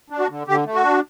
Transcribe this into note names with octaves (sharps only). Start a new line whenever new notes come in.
D4
F#4
D3
D3 G4
A3
F#4
D4